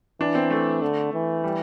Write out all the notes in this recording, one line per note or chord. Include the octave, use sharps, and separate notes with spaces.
E3 D4
C4
A3
D3
E3
G3